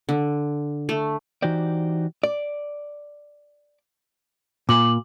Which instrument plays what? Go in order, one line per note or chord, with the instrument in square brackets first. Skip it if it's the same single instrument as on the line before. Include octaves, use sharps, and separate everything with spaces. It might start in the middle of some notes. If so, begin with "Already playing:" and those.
[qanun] D3
A3
[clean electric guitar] E3 D#4 F#4 G4 C5 D5
[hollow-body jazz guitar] D5
[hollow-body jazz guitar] A#2 [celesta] D6 F#7